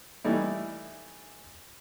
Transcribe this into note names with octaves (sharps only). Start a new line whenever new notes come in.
E3 G3 A3 D#4 E4